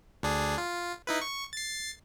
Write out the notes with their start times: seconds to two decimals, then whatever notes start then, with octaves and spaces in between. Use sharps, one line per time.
0.23 D2 D4 G#4
0.58 F4
1.07 D#4 E4 B4
1.21 C#6
1.53 A6 C7